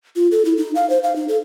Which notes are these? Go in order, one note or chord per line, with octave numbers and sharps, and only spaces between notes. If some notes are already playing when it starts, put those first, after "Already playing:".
F4
A4
E4
D#4
F5
C5
F5
D#4
A4